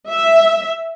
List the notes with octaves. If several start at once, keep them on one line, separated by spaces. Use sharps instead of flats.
E5